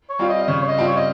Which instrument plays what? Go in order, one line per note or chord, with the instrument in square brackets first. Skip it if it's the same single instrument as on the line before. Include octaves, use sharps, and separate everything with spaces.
[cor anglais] C#5
[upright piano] G3 C4 F4
[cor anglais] D#5
D#5
[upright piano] C#3 [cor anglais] C#5
[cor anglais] C#5
D#5
[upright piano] G3 C4 F4
[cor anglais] C#5
D#5